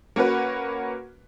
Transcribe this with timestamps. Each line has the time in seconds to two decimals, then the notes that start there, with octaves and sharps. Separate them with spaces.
0.16 A#3 C#4 F#4 B4